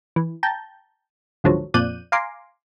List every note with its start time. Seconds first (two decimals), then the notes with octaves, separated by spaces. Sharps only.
0.16 E3
0.43 G5 A5 A#5 G6
1.44 G#1 C#2 D3 F3 F#3
1.74 F2 A#2 D5 F#6 G6 D#7
2.12 F5 G#5 A#5 C6 D6